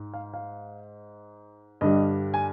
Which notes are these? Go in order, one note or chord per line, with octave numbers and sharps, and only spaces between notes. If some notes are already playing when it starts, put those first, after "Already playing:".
Already playing: G#2
F5
F5
G2 D3 G3 D#5
G#5